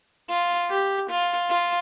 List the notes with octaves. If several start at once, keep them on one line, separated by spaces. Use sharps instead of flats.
F4
G4
F4
F4